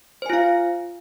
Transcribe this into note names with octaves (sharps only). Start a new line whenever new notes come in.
F4 C5 F5 G#5